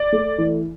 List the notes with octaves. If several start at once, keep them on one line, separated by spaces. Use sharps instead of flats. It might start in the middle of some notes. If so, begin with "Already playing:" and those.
Already playing: D5
A3
E3